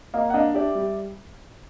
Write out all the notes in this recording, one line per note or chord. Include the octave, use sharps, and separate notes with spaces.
A#3 D#5 F5
F#5
D4 D#5 F5
G4 D5 E5
G3